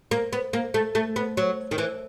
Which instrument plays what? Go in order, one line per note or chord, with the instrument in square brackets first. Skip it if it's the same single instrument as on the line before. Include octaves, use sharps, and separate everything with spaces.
[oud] A#3
B3
A#3
A3
A3
B3
F#3
D#3
E3